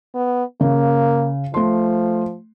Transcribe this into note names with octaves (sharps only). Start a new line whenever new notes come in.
B3
C#3 A#3
F3 A3 C6